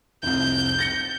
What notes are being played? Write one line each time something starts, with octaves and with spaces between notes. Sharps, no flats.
F1 C2 G6
A6 A#6 C#7